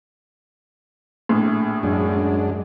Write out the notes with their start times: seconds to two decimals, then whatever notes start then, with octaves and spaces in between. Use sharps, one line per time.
1.29 A#1 A2
1.83 F#2 G#3 D4